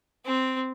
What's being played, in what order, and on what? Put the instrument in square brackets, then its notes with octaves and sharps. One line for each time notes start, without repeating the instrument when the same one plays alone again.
[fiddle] C4